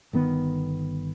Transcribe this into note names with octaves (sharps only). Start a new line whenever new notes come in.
G1 D#3 B3